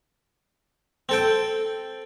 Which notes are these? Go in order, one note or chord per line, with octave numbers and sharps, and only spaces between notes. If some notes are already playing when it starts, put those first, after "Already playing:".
C4 A4 G5